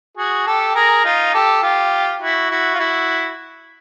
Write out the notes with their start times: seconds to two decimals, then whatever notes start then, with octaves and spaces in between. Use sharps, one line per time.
0.17 F#4 G#4
0.47 G4 A4
0.75 G#4 A#4
1.05 D#4 F4
1.34 G4 A4
1.63 F4 G4
2.21 E4 F#4
2.50 E4 F#4
2.74 F4
2.79 E4 F#4